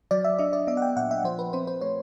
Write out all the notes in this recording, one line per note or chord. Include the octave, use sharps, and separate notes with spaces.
F#3 D5
E5
D4 D#5
D5
B3 E5
F#5
G5
A#2 F#5
E5
F3 C5
B4
C4 C5
C5
A3 C#5